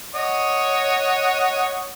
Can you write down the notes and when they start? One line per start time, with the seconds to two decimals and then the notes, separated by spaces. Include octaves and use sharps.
0.15 C#5 D#5 F#5